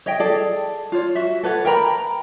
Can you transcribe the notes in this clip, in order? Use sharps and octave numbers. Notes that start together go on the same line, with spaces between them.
C#5 D#5 E5 G5
G#4 A4 D5
F4 C#5
F#4 E5
A4 B4 C#5 F#5
A#4 G5 A#5 B5